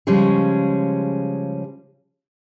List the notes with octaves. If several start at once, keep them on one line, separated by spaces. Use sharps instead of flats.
C#3 F3 G3 G#3 C#4 G#4